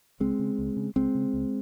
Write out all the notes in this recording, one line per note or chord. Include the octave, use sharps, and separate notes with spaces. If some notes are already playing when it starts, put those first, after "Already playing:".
C#2 G#3 C4
C#3
C#2
C#3
C#2 G#3 C4
C#3
C#2